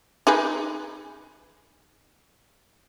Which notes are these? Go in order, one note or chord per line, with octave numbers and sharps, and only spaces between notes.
D#4 G#4 B4